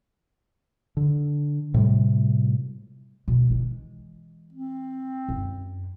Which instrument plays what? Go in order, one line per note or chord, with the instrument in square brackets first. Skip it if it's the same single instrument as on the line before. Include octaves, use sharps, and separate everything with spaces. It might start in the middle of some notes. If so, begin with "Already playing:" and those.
[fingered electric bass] D3
A2 C3 G3
[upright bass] B2
E3 G#3
[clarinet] C4
[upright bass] F#2